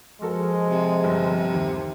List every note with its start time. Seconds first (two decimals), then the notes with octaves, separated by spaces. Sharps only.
0.22 F3 G#3 F#4 A4 A#4
0.70 C3
1.04 G1
1.54 D#2